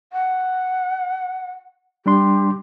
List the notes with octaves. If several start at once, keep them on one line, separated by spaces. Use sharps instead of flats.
F#5
G3 D4 G4 C6